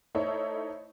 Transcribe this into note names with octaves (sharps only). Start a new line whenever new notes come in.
A3 D#4 E4 A4 C5 C#5